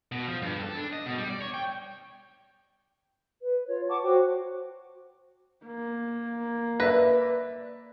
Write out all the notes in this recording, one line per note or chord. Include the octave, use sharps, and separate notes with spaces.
B2
F3
G2
A4
D4
D#5
B2
G3
D5
C#5
G5
B4
F4 C#5
F#5 A5 C#6 D6
F#4 C5 G5
A#3
B4 D5 E5 A#6